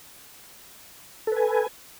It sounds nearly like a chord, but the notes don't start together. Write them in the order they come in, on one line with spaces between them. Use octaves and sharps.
A4 B4 G#5